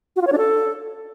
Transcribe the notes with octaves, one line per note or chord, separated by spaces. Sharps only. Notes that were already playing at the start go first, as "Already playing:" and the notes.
F#4
F4
C#5
D4
A4